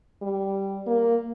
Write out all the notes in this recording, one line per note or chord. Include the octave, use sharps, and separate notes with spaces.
G3
A#3